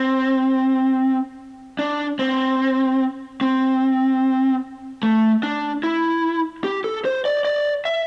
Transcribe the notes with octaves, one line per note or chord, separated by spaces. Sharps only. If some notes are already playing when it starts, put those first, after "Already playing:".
Already playing: C4
D4
C4
C4
A3
D4
E4
G4
A4
C5
D5
D5
E5